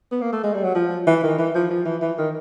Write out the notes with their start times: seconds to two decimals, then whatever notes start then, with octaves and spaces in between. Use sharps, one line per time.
0.12 B3
0.22 A#3
0.33 A3
0.44 G#3
0.54 G3
0.64 F#3
0.75 F3
1.07 E3
1.23 D#3
1.38 E3
1.55 F3
1.71 F3
1.85 E3
2.02 E3
2.18 D#3